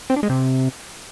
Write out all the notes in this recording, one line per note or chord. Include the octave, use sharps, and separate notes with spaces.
C4
D4
G#3
C3